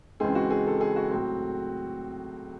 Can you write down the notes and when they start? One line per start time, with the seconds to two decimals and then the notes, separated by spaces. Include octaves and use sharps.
0.20 C#2 C#3 E3 G#3 C4 G#4
0.35 F#4
0.50 G#4
0.66 A4
0.81 G#4
0.96 F#4
1.11 A2 F#3 C4